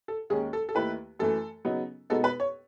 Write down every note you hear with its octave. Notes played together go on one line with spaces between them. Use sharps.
A4
D#2 D#3 G#3 C#4 G#4
A4
A4
D#2 D#3 A3 E4 B4
F#2 E3 A3 A4
C#3 F#3 B3 D#4
B2 G#3 B3 D#4 A4
B4
C#5